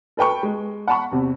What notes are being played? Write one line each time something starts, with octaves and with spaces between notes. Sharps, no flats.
A4 B4 G5 C#6
G#3
F#5 A5 B5 C#6
E2 C3